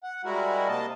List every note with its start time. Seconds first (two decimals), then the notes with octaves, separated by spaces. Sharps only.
0.03 F#5
0.25 G3 G#3 E4 F#4 A#4
0.68 C3 A#3 D#5 A5